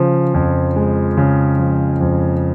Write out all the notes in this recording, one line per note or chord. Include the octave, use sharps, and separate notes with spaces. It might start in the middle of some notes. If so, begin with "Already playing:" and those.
Already playing: C#3 F3
F2
G#3
C#3
F3
F2